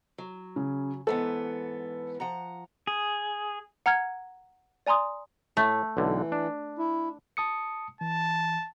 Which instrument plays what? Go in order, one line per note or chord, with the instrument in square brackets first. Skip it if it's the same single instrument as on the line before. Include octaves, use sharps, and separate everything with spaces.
[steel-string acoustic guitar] F#3
[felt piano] C#3
[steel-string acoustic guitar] G#2 E3 B3 [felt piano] A4
[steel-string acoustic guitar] F3 F#5 A#5
[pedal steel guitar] G#4
[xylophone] F#5 A#5 F6 G#6
D5 G#5 A#5 C6 D#6
[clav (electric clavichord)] A2 [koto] A3
[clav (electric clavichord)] B1 D3 [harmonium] E3
[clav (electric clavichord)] D4
[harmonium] E4
[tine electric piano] A5 D#6 C#7
[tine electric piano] E3 [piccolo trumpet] A5